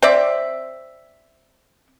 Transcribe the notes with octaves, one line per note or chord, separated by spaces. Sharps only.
C4 D5 E5